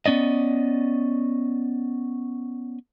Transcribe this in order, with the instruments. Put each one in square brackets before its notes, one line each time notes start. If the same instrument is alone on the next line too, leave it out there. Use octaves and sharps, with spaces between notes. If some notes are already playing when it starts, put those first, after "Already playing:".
[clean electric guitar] B3 C#4 D5 D#5